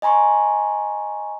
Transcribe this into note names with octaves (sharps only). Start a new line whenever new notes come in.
D#5 G#5 A#5 C6 C#6